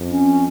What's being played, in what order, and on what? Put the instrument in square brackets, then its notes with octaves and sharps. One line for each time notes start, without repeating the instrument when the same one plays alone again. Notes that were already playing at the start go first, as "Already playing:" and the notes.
Already playing: [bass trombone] F2
[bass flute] C#4